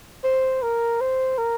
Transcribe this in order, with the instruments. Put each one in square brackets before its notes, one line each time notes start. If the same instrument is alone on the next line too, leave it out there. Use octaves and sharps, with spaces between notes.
[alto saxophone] C5
A#4
C5
A#4